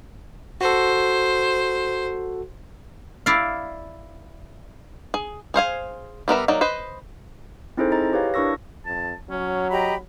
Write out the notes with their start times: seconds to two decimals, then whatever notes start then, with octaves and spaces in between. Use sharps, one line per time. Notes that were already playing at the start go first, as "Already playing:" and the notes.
0.61 F#4 A4 C5
3.26 E4 D5 F5
5.14 G#4
5.54 G#4 C5 F5 G#5
6.28 G3 B3 A#4 E5
6.48 F#3 A#3 D#4 D5
6.61 B4 C5 D#5
7.77 C4 D#4 E4 G#4 A4 C5
7.92 E4 G#4 D#5 A#5 A6
8.13 G4 B4 C#5 F5
8.34 D4 E4 A#4 C#6 E6 A#6
8.86 F2 A5
9.30 F#3 C#4
9.70 G4 D#5 A#5 B5